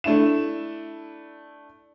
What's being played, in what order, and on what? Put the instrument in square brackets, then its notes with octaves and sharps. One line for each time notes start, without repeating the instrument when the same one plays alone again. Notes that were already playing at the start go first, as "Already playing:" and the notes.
[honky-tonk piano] A3 D4 E4 E7